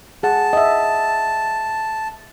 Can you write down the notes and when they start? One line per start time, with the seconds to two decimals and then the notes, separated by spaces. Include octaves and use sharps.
0.23 G#4 F#5 A5
0.53 D#5 E5